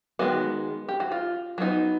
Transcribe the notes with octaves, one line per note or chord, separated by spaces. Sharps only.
D#3 G#3 B3 F#4
G4
F#4
F4
F#3 B3 D#4